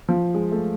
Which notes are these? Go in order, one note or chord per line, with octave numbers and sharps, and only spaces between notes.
F3
G#3
A3